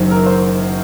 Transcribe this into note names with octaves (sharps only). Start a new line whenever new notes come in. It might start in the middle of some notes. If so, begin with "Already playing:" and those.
Already playing: F#1 F#2 D#3 F#3 C5
A#4
C5